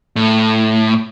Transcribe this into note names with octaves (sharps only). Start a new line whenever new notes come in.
A2